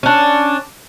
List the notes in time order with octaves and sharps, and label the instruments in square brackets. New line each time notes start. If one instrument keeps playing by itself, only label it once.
[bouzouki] C#4 D4